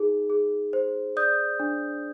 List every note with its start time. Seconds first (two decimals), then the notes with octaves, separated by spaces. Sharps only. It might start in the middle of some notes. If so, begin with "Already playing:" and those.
Already playing: D#4 G#4
0.30 G#4
0.73 C5
1.16 D5 D#6 G6
1.60 D4